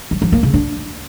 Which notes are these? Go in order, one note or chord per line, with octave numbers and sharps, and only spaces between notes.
F#3
F3
A#3
C#3
D4